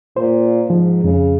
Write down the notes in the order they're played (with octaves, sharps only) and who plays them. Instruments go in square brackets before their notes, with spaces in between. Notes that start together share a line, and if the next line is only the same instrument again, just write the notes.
[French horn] A#2 [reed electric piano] C5
[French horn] G#2 [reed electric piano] F3
[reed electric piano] F2 [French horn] C#3